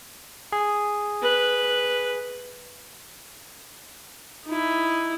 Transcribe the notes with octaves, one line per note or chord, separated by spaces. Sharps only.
G#4
B4
D#4 E4